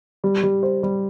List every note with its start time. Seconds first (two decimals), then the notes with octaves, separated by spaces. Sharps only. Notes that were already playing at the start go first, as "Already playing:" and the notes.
0.24 G3
0.43 G3
0.63 C5
0.83 G3